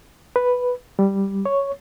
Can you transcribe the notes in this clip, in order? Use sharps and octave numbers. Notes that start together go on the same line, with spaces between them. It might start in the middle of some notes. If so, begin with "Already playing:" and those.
B4
G3
C#5